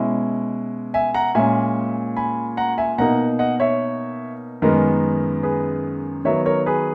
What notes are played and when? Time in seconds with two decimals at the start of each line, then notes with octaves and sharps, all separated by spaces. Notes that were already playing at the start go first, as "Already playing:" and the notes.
Already playing: B2 G#3 C#4 E4
0.94 E5 G#5
1.14 F#5 A#5
1.35 A#2 G#3 C#4 E5 G#5
2.16 G#5 B5
2.57 F#5 A#5
2.78 E5 G#5
2.98 B2 A#3 D#4 F#5 A#5
3.39 D#5 F#5
3.60 C#5 E5
4.62 F#2 D#3 G#3 B3 A#4
5.43 G#4 B4
6.25 D#3 F#3 B3 C#5 E5
6.45 A#4 C#5
6.66 G#4 B4